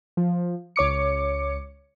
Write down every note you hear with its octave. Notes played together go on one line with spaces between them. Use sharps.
F3
C#2 C#5 D6 C#7